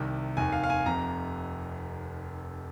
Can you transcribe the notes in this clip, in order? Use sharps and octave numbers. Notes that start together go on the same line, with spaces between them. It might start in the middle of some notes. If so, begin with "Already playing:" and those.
Already playing: C2 C3 D#3
F1 D#2 D#3 G#5
F5
F5
G#5
F1 F2 C3 A#5